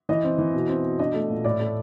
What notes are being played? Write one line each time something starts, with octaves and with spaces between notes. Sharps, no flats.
E3 D#5
C4
E3
B2
C4
B2
D4 D#5
A3
A#2
A2 D5
A3